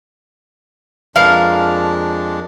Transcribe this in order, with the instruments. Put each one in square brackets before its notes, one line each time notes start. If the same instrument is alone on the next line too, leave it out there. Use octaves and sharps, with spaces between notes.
[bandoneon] F2 G#3 D4 [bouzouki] F3 A#4 [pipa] B4 F5